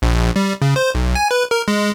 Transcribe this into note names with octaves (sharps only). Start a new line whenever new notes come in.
A#1
G3
C#3
C5
B1
G#5
B4
A#4
G#3